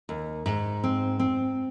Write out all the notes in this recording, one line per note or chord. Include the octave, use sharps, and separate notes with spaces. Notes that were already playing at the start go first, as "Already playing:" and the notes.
D#2
G#2
C4
C4